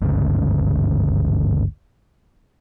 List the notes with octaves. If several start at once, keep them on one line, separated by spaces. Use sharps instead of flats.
G1 D2 G#2 C#3